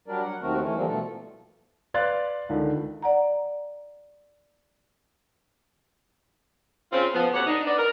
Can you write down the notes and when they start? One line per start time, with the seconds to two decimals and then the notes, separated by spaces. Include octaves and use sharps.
0.08 F#3 G3 D4 A#4 D5
0.22 F#3 F#5
0.42 D#2 D#3 A3 C4 F#4 A#4
0.61 E3 A3 C#4
0.76 D3 E3 F3 G3 A#3 C4
0.88 B2 F3 A3 A4
1.94 B4 D5 F5 C6 F#6 A6
2.49 C#2 D3 D#3
3.02 D5 F#5 A#5
6.92 C#3 C4 F4
7.14 F3 B3
7.33 D2 D3 C#4 G4 C#5 F#5
7.47 D4 D#4
7.67 B3 D5
7.78 A#4